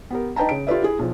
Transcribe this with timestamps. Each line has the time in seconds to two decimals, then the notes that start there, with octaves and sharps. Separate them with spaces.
0.11 B3 G4 A#4
0.36 D#4 B4 G5 A5 A#5
0.49 C#3 D7
0.67 F4 G4 A4 B4 D5 E5
0.82 E4 G#4
0.99 B1 F3